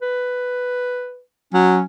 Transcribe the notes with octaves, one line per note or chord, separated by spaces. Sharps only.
B4
F#3 C#4